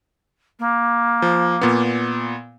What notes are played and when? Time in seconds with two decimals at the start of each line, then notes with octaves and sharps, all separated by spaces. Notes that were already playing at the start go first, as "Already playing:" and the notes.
0.59 A#3
1.22 F3
1.61 A#2 B3